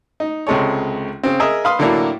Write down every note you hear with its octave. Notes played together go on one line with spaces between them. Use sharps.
D#4
C#2 C3 G#3 A4 C#5
C#3 C4
G#4 A#4 D#5 E5
B4 F5 B5 C6 D#6 F6
A2 D3 F#3 A#3 D4 E4